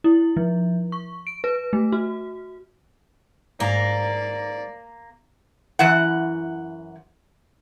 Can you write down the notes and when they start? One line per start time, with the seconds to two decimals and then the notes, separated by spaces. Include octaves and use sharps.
0.04 E4
0.37 F3
0.92 C#6
1.27 D7
1.44 B4
1.73 A3
1.92 F#4
3.60 G#2 A#3 B4 D5 A#5
5.79 F#2 E3 F#5